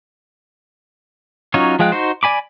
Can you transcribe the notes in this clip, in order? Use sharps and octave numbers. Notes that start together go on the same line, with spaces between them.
F#3 C#4 D#4 F4 C#5
F3 G#3 F5 G5 F#6
D#4 F#4 C5
D5 G#5 B5 D6